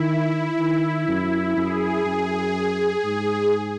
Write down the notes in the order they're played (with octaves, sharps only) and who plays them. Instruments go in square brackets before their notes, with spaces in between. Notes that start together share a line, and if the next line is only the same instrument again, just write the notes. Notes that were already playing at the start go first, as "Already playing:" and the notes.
Already playing: [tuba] D#3 [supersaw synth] E4
[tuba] D#3
F#2
[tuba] F#2 [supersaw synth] G#4
[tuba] F#2
G#2